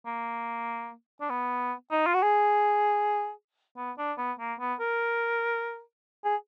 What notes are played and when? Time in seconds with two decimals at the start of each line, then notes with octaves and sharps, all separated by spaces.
0.06 A#3
1.21 D4
1.30 B3
1.92 D#4
2.06 F4
2.14 F#4
2.23 G#4
3.77 B3
3.98 D4
4.18 B3
4.39 A#3
4.60 B3
4.80 A#4
6.25 G#4